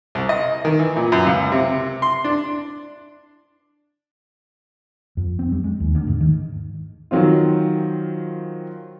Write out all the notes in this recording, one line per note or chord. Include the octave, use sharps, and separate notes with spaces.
C2
D#5
D#3
E3
A#2
F#2
C#2
C3
C6
D4
F2
C4
G3
G#3
D#2
D2
G#2
D#3
D#3 F#3 C4 F4